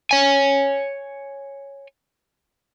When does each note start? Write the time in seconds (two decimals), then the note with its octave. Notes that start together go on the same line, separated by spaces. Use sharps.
0.11 C#5 G#5